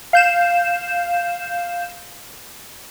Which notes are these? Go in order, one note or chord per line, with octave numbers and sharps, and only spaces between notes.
F5 G6 E7